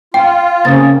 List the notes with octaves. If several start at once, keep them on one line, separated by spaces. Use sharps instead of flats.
F4 G5
C#3 A#3 C4 D#6 A6